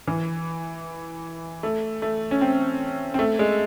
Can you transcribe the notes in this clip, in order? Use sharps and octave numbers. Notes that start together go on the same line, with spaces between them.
E3
A3
A3
C#4
C4
C4
A3
G#3